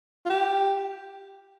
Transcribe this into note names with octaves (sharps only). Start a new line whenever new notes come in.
F4
G4